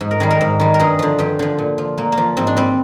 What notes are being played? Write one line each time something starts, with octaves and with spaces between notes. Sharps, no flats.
G#2
A#4
D#3 G3 G#4
A#4
G#2
D#3 G3
A#4
G2 G#4
D3 F3
G2 G4
D3 F3
A#2
F3
A#2 A#3
A#3
F3
G#2 C4
D4
G3 C4